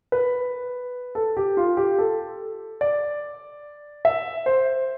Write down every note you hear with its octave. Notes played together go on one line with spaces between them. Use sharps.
B4
A4
G4
F4
G4
A4
D5
E5
C5